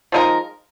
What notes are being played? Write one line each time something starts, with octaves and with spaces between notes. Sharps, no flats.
F3 G#3 D#4 A#4